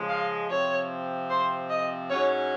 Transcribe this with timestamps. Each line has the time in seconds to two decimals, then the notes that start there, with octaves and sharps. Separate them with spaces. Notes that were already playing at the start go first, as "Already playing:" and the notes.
Already playing: C#3 F3 G#3
0.09 F5
0.49 C3 F3 C4 C#5
1.30 C5
1.70 D#5
2.10 G#2 F#3 C#4 C#5